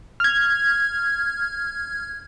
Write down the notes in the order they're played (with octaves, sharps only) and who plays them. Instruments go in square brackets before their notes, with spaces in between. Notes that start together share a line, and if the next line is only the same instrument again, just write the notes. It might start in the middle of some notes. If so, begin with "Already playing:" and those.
[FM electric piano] F6 G#6